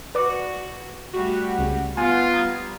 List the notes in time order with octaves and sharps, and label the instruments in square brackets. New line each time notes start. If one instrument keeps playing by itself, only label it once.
[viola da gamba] F#4 [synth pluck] B4 D5 D6
[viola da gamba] G3 A3 [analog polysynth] F#4
[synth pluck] C#2 C#3
[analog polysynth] B3 [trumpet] F4 [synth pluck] G#5
[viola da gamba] G3 [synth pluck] A#5 D#6 G#6